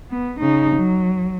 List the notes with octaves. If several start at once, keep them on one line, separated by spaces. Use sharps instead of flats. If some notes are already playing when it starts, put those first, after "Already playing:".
B3
C#3 D#4
F#3